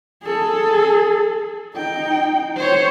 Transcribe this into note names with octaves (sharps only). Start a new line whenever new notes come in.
G#4 A4
D#4 G5
C5 C#5